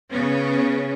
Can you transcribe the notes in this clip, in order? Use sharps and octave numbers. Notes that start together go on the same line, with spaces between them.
C#3 B3 C#4